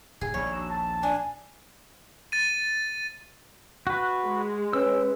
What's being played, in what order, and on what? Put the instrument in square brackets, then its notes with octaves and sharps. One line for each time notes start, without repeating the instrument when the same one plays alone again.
[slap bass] D1 [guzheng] G#4
[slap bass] A#1 D#2 [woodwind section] G3 [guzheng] C#5
[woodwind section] D4 F#4 E6
A5
[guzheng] D4 [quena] G#5
[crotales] A6 D#7
[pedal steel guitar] F#4 B4
[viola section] G#3
[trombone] C#4 [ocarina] B4 [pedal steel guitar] E6